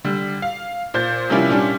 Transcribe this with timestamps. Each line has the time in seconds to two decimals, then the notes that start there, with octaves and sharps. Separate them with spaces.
0.05 D3 G3
0.42 F5
0.94 A#2 C5 G6 A6
1.30 C3 F3 G3 A#3 C#4 E4
1.49 A#2 G3 C#4 D4